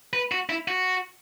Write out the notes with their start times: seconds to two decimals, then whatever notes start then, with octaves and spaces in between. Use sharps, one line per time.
0.13 B4
0.32 F#4
0.49 E4
0.68 F#4